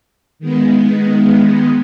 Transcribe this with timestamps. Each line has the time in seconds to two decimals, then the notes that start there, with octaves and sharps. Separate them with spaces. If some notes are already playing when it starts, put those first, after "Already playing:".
0.39 D#3 G#3 B3